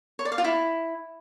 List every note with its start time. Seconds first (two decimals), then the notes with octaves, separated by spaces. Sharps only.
0.19 C#5
0.25 D5
0.32 F5
0.38 F4
0.44 E4